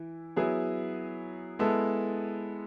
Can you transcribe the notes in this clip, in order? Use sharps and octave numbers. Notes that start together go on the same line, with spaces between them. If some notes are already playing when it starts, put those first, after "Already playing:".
Already playing: E3 E4
F#3 B3 E4 G#4
G#3 B3 E4 A4